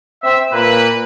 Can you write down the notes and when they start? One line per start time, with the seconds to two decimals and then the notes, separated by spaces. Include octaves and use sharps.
0.23 C4 E5
0.53 A#2 A#3 B4